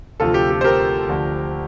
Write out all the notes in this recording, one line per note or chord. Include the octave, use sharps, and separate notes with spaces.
D2 C3 F3 F4 A4
G4
G4
C5
G4 A#4
D2 D3 F3